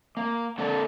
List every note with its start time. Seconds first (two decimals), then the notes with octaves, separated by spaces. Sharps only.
0.17 A#3
0.58 D3 A#3 A4